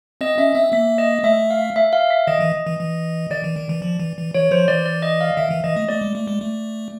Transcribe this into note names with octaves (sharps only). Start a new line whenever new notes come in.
C4 D#5
C#4 E5
C4 E5
A#3 E5
D#5
A3 E5
F5
E5
F5
E5
D#3 D#5
E3
E3
E3
D#3 D5
E3
D#3
E3
F3
E3
E3
E3 C#5
F3 C5
E3 D5
D5
D#5
F5
D#3 E5
E3
E3 D#5
A3
A3 D5
G#3
A3
G#3
A3